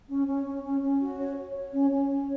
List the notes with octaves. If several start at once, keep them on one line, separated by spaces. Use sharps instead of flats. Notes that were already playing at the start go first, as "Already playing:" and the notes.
C#4
C#4
C#4
C#4
C#4
F#4
C#5
C#5
C#5
C#4
C#4
C#5